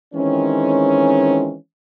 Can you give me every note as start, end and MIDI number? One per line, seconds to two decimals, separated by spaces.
0.14 1.55 51
0.14 1.55 52
0.14 1.55 56
0.14 1.55 60
0.14 1.55 61